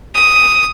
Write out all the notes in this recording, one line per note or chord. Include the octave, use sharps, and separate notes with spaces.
D#6